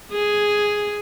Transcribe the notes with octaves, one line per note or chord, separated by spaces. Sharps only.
G#4